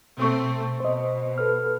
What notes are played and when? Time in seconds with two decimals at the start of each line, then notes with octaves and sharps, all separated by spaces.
0.18 B2 A3 C4 C#6
0.80 B2 C5 D#5
1.38 A4 B4 F6